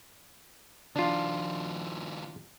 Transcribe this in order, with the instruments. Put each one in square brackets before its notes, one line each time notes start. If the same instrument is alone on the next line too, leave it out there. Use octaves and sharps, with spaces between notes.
[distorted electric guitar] D#3 F3 [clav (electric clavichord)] D4 F4